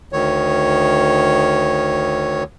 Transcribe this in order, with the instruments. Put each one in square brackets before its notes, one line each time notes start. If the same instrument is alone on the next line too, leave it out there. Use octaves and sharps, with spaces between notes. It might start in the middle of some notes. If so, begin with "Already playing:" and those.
[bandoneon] D2 D#3 C#5